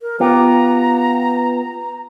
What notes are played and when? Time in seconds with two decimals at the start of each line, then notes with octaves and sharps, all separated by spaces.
0.01 A#4
0.20 B3 F4 G4 A#5